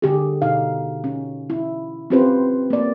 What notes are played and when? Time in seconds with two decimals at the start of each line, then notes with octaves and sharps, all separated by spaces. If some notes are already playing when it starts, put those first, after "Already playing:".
0.02 D3 G4 G#4
0.42 B2 D#4 F5
1.04 C#4
1.50 E4
2.10 C4 C#4 F4 G4 B4 C5
2.70 A#3 D5